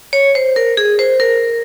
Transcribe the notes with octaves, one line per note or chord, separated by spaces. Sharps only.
C#5
C5
A#4
G#4
C5
A#4